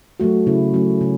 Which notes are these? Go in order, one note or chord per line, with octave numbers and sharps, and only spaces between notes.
F#3 A3 F#4
C#3 E4
F#3 A3 C#4
C#3